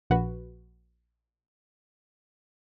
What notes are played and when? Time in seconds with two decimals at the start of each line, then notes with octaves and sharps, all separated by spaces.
0.10 A#1 F#4 B4